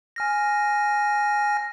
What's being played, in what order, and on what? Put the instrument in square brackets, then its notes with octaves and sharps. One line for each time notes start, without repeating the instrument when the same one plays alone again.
[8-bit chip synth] G#5 F6 A#6